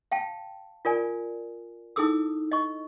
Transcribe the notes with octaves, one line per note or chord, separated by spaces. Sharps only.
F5 G5 A5
F4 A#4 D5 G#5
D#4 E4 G#4 A4 D#6 E6
D#5 C#6